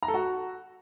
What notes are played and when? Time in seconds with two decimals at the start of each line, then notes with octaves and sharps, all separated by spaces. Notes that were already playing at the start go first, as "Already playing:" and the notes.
0.03 A#5
0.08 A4
0.14 F#4